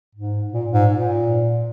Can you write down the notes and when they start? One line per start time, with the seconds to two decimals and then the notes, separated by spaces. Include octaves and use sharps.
0.15 G#2
0.52 A#2
0.71 G#2
0.90 A#2